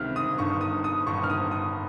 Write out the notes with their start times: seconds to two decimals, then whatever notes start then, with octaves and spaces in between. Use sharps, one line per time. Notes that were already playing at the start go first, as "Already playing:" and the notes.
Already playing: C#2 C3 D#3 F6
0.16 D#6
0.38 G1 G2 D#3 C#6
0.61 D#6
0.84 D#6
1.07 G1 G2 D#3 C#6
1.24 F6
1.30 D#6
1.51 D#6